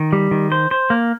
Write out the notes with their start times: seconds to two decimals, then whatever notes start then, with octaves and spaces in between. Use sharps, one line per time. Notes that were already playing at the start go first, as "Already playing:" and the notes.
Already playing: D#3
0.13 G3
0.31 D#3
0.52 C5
0.71 C5
0.90 A#3